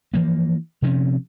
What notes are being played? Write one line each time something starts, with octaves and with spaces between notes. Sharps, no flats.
E3 F3 A#3
C3 F3 C4 C#4